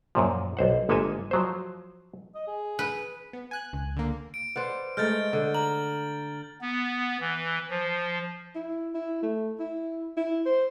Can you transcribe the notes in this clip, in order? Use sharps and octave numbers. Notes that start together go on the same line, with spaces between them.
F#2 A#2 F3
B1 C5 F#5
G1 G#3 A#3 A4 E5 G#5
F3 F#3 C5
D#5
G#4
B4
B3
G#5 F#6 G#6
C#2
D3 A#3
D7
B4 C5 D5 F#5
G#3 A3 D#4 F6 G6 A6
D3
A#5 F#7
B3
E3
F3
E4
E4
A3
E4
E4
C5